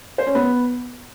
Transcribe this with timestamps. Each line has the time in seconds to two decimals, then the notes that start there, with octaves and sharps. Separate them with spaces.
0.18 C5
0.27 C#4
0.35 B3